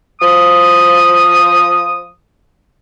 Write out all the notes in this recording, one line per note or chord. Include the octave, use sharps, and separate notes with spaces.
F3 D#6